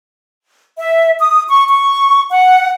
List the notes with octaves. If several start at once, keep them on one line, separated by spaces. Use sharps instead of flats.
E5
D#6
C#6
C#6
F#5